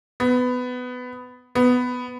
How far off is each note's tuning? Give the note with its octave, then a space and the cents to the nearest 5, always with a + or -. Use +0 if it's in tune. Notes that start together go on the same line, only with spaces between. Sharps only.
B3 +15
B3 +10